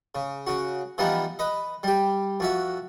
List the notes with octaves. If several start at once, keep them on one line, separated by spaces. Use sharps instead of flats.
C#3
C#3 F#4
E3 F3 G3 B3 D#4
B4 D#5
G3 G4
F2 F#4 E5